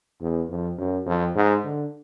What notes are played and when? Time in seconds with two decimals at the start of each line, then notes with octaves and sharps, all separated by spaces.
0.21 E2
0.49 F2
0.78 F#2
1.06 F2
1.35 G#2
1.64 D3